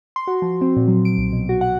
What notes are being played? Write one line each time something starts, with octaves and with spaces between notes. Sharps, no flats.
C6
F#4
F3
C4
A#2
F#3
D7
B1
B2
F#4
F#5